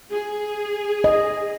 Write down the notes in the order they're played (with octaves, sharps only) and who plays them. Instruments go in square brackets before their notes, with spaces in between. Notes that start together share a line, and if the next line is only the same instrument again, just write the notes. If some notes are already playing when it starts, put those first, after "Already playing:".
[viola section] G#4
[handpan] D#5